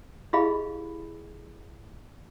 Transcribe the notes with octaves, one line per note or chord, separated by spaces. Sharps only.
E4 G4 G#4 D#5 F5 B5